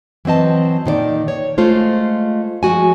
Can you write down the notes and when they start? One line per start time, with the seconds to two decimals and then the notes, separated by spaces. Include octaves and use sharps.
0.25 E3 F#3 C4 D#5 A5
0.86 A#2 D#3 C5 D5
1.28 C#5
1.58 G#3 A3 F4 C5
2.63 F3 G#3 F#4 G#5